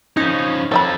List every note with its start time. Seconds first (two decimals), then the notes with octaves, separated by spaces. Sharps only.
0.17 F3 C#4 D#4
0.72 F3 A4 C#5 D#5 B5